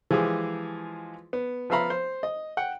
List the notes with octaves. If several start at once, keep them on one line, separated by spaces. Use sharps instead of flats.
E3 F3 G#3 G4 G#4
B3
F3 B3 E5 F5 A#5 B5
C5
D#5
F#5 G5